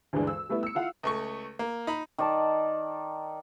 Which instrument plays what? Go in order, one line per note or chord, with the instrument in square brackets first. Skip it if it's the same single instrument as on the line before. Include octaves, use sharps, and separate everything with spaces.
[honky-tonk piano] D2 G2 E3 G#3 D4
E6
G3 A3 B3 E4
E6 C#7
E4 F4 F5 F#5
[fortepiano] C#2 A3 C#6
A#3
D#4 B5
[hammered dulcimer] D#3 D5 A5